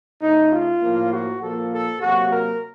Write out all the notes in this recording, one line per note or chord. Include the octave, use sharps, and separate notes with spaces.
C#3 A3 D#4
F4
A2 F3 A#3
F#4
A#2 F3 A#3 A4
A4
C3 F#3 A#3 F#4
A#4